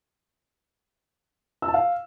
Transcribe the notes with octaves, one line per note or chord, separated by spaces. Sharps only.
E6
A5
F5